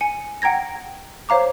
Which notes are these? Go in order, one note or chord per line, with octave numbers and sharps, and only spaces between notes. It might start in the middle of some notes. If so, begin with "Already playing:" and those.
G#5 C#7
F#5 G5 A#5 G#6 A#6
C5 C#5 F5 A#5 D6